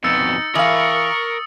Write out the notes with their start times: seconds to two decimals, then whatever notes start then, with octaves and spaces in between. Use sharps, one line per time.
0.04 F2 B2 D#4 E6 A6 C#7
0.55 E3 A#4 F5 B5 C#6 D#6